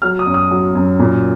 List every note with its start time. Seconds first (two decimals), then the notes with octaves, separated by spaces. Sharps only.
0.02 F#3 F6
0.19 D#6
0.26 F#2
0.34 D#6
0.51 F#3
0.75 F#2
0.99 A#2